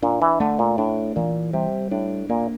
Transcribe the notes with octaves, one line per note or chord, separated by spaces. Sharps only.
A#2 D4
E3
D3 A3
A#2
A2 D4
A#2 E3
C3 G3
A2 D4
A#2 A#3